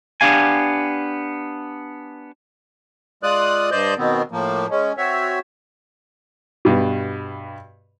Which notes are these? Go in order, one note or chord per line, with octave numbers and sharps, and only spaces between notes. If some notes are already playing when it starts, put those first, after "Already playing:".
B3 D4 G4 F5 G#5
G#3 F4 D5 D#6 F#6
G2 C5 D5 D#5 G6
B2 D#3 B3 C4
A2 F3 A#3
G#3 C#4
C4 F#4 C#5 E5
G2 B2